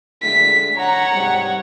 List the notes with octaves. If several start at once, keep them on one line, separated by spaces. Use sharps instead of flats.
D3 G#3 A3 B6
C#5 F#5 A#5
G#2 C3 G3